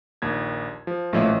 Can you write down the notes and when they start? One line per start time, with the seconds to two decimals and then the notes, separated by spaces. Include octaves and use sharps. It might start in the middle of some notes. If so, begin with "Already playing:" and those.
0.22 A#1 D#2 G#6
0.87 F3
1.13 A1 A#2 F3 A3 E4 C#5